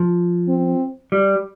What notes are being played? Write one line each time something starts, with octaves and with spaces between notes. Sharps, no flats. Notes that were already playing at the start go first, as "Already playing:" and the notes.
Already playing: F3
C4
G3